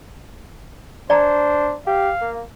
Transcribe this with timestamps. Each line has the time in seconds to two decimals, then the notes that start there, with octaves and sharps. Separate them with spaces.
1.10 D4 C5 D5 G#5 A#5
1.87 G4 F5
2.22 A#3